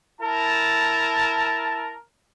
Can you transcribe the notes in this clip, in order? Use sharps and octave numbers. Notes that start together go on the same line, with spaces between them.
E4 A#4 A5